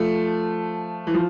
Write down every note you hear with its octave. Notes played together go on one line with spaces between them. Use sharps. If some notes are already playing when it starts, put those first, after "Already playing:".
Already playing: F3 A3
E3
F3